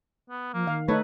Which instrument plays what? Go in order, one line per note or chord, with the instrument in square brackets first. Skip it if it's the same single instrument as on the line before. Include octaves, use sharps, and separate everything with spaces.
[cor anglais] B3
[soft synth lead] F3 [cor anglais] A#3
[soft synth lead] D#3 [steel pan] F5
[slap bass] A3 [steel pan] D#4 A4 B4 [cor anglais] C#5